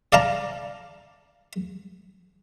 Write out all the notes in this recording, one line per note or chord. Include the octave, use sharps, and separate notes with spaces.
D5 F5 A5 A#5